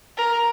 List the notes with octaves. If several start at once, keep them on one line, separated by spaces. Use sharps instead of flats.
A#4